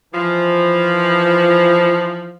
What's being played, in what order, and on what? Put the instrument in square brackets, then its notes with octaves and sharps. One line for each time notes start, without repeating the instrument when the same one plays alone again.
[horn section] E3 F3